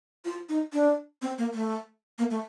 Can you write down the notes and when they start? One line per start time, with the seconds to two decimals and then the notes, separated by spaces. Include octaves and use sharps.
0.25 F4
0.49 D#4
0.73 D4
1.22 C4
1.38 A#3
1.54 A3
2.18 A#3
2.31 A3